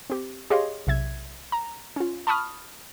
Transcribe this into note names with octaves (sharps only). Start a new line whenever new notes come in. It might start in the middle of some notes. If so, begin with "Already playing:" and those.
C4 G4
G4 G#4 C#5 D#5 F5 C6
B1 C3 E5 G#6
A#5
C#4 F4
A5 B5 C#6 D#6 F6